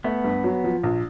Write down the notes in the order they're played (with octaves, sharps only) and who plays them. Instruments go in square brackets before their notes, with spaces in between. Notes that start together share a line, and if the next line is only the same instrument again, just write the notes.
[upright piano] A3 [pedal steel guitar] B3
[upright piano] G2
F#3
F3
A#1